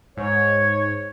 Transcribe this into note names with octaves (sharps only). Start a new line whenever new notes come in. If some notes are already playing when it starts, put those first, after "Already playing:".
G#2 C#5